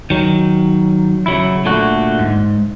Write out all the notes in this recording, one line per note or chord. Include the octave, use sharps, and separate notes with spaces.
D#3 F#3
C#3 F#3 E4
A#2 D3 A3 F#4
G#2